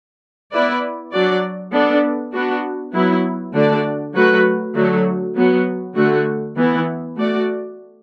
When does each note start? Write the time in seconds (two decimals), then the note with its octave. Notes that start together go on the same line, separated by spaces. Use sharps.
0.52 B3 E4 B4 D5
1.12 F#3 D4 F#4 D5
1.73 B3 D4 A4 D5
2.33 B3 D4 F#4
2.93 F#3 B3 E4
3.54 D3 A3 D4 F#4 D5
4.15 F#3 A3 F#4 B4
4.75 D3 F#3 A3 F#4
5.36 F#3 B3 F#4
5.96 D3 A3 F#4
6.56 E3 B3 E4
7.16 A3 F#4 D5